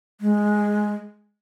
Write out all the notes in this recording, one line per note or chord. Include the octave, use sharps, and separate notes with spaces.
G#3